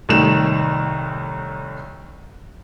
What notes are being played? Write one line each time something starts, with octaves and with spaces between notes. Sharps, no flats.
C2 A2 D#3 E7